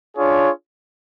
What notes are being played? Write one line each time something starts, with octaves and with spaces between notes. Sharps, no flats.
D4 F4 G#4 C#5